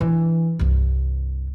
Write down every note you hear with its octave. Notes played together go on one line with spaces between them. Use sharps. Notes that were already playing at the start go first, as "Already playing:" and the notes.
E3 D4
C2 G2